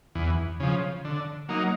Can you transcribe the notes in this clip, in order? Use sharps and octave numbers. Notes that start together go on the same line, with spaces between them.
E2
C#3 F3
D3
F#3 A#3 D#4